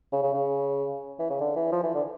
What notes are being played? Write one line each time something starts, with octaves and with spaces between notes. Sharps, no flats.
C#3
C#3
C#3
E3
C#3
D3
E3
F3
E3
D3